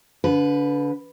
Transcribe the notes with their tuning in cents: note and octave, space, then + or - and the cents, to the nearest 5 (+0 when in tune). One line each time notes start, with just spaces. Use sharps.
D3 -35 B4 +0